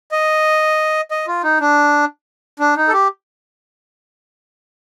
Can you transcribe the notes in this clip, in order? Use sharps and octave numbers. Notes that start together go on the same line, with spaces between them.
D#5
D#5
F4
D#4
D4
D4
D#4
A4
G4